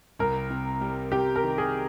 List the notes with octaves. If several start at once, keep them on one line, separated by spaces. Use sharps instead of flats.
C2 A#4
C3
G3
C3 G4
A#4
D#3
G#4